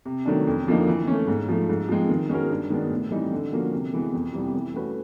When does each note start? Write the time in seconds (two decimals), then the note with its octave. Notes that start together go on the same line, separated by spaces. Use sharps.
0.05 C3
0.25 D#3 F#3 A3 D4
0.47 F2
0.67 D3 F3 A#3 D#4
0.87 E3
1.07 A3 C#4
1.27 G#2
1.48 F3 A3
1.69 G#2
1.88 F3 G#3 C4
2.09 D#3
2.29 G#3 C#4 F#4 A#4
2.50 G2
2.70 D#3 G#3 B3 D4
2.91 A2
3.11 E3 G3 C4 D#4
3.32 D3
3.52 F3 A#3 C#4 F#4
3.73 C3
3.93 E3 G#3 B3
4.14 F2
4.33 C3 E3 G3 B3
4.55 E3
4.74 A3 C#4 F#4 B4